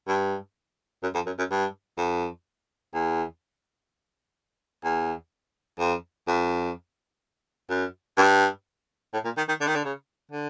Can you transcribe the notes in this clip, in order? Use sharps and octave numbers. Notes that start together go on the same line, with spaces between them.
G2
F#2
F2
F#2
F#2
G2
F2
E2
E2
F2
F2
F#2
G2
A2
A#2
D#3
D#3
D3
D#3
D3
C#3
D3